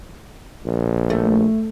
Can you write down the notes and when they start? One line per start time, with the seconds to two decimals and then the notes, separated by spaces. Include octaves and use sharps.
0.66 A#1
1.10 A3